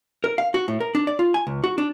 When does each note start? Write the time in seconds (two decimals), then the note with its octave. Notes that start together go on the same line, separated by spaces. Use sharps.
0.24 A#4
0.38 F5
0.54 F#4
0.68 A2
0.80 A#4
0.95 D4
1.07 D5
1.19 F4
1.34 G#5
1.47 C#2
1.64 F#4
1.78 D4